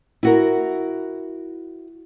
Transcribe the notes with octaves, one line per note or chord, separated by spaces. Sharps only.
E4 F#4 A#4